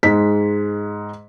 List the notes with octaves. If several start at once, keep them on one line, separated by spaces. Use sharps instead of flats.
G#2 G#3 B6